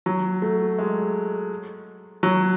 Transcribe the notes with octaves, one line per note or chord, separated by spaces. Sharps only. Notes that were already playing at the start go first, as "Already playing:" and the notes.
F#3
A3
G#3
F#3